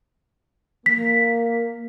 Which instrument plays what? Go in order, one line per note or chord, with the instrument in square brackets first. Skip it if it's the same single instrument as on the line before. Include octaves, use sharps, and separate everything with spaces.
[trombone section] A#3 [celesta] B6